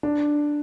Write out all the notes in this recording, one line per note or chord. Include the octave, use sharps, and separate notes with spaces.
D4